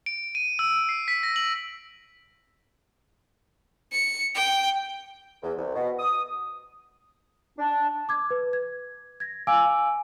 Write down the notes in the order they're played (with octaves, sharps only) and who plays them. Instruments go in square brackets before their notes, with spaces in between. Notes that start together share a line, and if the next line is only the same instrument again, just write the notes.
[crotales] D7
D#7
E6
C7
B6
A#6
F#7
[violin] C#7
G5
[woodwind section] E2
C2
B2
D#6
D4
[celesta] D6 G#6
B4
G#6
G#6 A#6
F5 G#5 D6 E6 D7